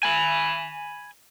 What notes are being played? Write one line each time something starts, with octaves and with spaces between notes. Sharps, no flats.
G#5 B5